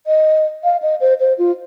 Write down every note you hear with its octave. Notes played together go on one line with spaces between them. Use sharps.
D#5
F5
D#5
C5
C5
F4